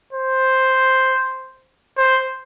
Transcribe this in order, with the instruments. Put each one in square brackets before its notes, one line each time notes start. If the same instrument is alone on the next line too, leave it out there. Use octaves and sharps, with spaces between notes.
[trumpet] C5
C5